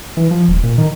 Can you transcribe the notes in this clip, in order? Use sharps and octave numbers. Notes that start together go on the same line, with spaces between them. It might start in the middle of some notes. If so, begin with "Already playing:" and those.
E3
F3
D#1
A#2
D#3